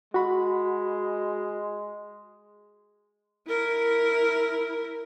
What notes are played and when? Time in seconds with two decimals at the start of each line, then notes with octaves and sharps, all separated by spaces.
0.14 G#3 F#4 B5
3.47 E4 A#4